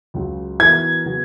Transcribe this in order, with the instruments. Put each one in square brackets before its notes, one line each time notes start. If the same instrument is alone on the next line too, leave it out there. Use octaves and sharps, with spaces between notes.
[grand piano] C#2 C#3 F#3
[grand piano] E3 B3 F#4 A#4 [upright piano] G#6
[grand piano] C#3 F#3 B3